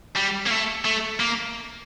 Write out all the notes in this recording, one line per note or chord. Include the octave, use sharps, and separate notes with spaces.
G3
A#3
A3
A3
A#3